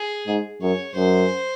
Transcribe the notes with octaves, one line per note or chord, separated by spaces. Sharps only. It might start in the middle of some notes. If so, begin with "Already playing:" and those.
Already playing: G#4
G#2
F#2 C#5
F#2 C5